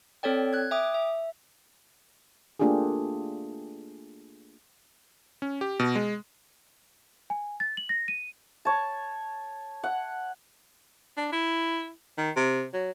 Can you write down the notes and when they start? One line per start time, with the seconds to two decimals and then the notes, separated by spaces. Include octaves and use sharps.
0.23 C4 A4 C#5 D5 G5
0.53 F#6 G#6
0.71 E5 G5 D6 D#6
0.94 E5
2.59 A3 A#3 D4 F4 G4 G#4
5.42 C#4
5.61 G4
5.79 B2
5.95 G#3
7.30 G#5
7.60 A6
7.77 F#7
7.89 A#6
8.08 D#7
8.65 C#5 A5
9.83 F#5
11.17 D4
11.32 E4
12.18 D#3
12.36 C3
12.74 F#3